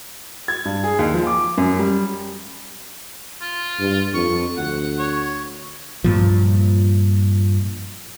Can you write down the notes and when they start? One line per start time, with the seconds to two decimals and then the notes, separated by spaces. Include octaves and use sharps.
0.48 G#6
0.65 G2
0.84 G#4
0.99 D#2
1.14 F3
1.27 D6
1.58 F#2
1.79 G3
3.41 F4
3.80 G2
4.14 F2 C#6
4.57 D2 F#5
4.99 C#5
6.04 G2 A#2 F3